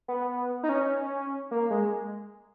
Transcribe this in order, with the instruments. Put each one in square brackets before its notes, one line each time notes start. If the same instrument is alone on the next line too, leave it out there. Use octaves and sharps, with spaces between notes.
[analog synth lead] B3
D#4
C#4
A#3
G#3